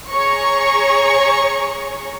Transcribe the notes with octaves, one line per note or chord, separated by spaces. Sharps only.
G#4 C#5 A#5 C#6